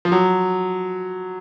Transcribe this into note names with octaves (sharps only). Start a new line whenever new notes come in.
F3
F#3